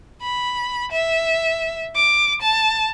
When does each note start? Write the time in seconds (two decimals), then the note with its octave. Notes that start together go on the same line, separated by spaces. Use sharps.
0.22 B5
0.92 E5
1.96 D6
2.42 A5